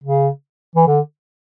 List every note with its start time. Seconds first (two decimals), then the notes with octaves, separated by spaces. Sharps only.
0.04 C#3
0.75 E3
0.87 D3